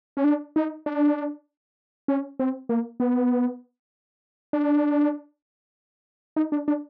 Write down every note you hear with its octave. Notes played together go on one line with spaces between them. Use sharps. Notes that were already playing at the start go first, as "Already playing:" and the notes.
C#4
D4
D#4
D4
C#4
C4
A#3
B3
D4
D#4
D4
D4